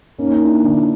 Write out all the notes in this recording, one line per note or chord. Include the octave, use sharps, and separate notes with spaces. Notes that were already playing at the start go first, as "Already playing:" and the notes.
A#3 C#4 D#4
D#4
A#3 D4 E4
D3 D4 E4